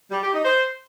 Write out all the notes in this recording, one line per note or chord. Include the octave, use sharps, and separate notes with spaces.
G3
G4
D#4
C5